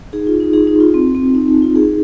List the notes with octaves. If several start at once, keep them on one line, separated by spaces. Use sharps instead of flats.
D#4 G#4
F4
D#4
D#4 G#4
D#4
F4
C4
C4
D#4
D#4
F4
D#4 G#4